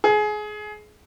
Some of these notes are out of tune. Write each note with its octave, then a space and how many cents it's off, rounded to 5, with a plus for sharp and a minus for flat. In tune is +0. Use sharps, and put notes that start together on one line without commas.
G#4 +25